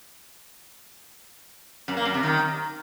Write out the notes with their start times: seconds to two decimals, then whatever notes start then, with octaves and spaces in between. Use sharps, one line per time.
1.88 F#2
1.97 A#3
2.05 F#2
2.14 C3
2.23 D#3